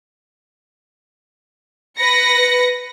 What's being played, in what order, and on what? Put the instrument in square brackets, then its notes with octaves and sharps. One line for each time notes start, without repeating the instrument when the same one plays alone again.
[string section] B4 A#6 C#7